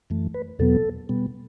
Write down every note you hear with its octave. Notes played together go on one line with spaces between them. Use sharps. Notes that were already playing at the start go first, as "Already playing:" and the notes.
F#2 E3 A3
B4
E2 B2 F#3 B3 A4
B2 G3 B3